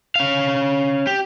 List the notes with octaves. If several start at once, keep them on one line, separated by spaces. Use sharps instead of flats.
C#4 F5
G4